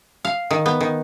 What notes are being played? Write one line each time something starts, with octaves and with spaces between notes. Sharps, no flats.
F5
D#3
B3
D#3